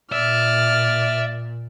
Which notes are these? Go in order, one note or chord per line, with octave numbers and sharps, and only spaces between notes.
A#2 D5 E5 F6